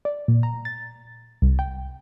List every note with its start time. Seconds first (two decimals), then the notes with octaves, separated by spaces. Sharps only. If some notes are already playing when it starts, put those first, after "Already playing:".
0.05 D5
0.28 A#2
0.43 A#5
0.65 A6
1.42 C2
1.59 G5